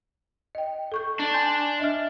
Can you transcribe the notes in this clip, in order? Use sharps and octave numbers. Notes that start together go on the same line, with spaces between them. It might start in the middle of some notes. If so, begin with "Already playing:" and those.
D#5 G5
A4 C#6 G6
D4
G#5 C6 G6
D#5 E5 F6